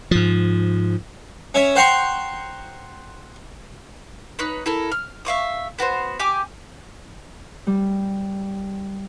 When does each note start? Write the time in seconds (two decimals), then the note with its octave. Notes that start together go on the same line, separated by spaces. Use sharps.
0.11 G#2 F3
1.55 C#4 C#5 E5
1.76 C5 F#5 G5 A#5 C6 C#6
4.39 D#4 B4 C#5
4.66 E4 A4 A#4
4.92 F6
5.25 E5 F5 C#6 D#6
5.79 B3 F#4 A4 C5
6.19 G4 G#5 D6
7.67 G3